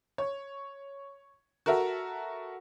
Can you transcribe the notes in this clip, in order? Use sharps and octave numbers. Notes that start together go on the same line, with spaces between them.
C#5
F#4 A4 A#4 E5